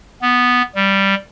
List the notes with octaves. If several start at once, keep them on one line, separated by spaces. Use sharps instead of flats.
B3
G3